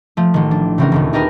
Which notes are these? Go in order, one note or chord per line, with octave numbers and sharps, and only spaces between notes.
F3 A3
A1 D#3
D4
C#3 E3 C4 C#4 F#4 A#4
D#1 D2 D#3
D4 D#4 G4 G#4 A#4 B4